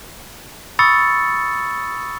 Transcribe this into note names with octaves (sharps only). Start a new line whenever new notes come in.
B5 C#6 D#6 E6 A6 C#7